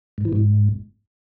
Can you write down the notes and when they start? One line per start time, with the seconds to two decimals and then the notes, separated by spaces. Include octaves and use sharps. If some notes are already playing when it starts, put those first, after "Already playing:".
0.18 G#2
0.25 E3
0.33 G#2